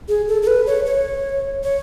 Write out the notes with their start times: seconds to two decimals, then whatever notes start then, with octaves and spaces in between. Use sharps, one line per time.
0.08 G#4
0.28 A4
0.42 A4
0.47 B4
0.67 C#5
0.86 C#5
1.63 C#5